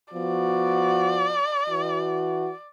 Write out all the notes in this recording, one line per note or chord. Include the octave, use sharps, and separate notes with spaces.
F3 B3 F#4 D5
E3 F#4